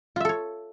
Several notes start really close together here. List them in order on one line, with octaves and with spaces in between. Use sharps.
F4 E5 A4 C#5